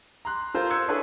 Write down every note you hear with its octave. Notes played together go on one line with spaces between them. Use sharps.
A#5 C6 F#6
F4 A4 A#4 C5 A#5
C6 E6 F#6 G#6 C#7
D4 E4 G#4 A4 B4 C#5